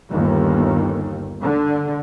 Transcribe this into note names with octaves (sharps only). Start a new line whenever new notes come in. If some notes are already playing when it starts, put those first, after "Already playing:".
G1 D#2
D3